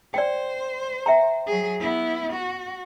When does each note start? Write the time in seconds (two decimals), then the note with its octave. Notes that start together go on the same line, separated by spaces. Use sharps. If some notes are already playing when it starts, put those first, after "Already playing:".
0.14 C5 D5 G5
1.06 E5 G5 A#5
1.47 F#3 G#4
1.80 B3 E4
2.33 F#4